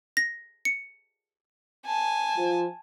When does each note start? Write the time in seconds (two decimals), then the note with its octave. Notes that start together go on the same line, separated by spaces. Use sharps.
0.17 A#6
0.65 C#7
1.86 G#5 A5
2.37 F3